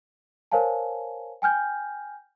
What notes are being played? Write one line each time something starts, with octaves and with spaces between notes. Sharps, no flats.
A#4 C5 C#5 F5 G#5 A5
G5 G#5 F6 G6